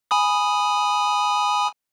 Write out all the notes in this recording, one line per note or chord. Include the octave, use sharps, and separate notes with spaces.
G#5 B5 D#6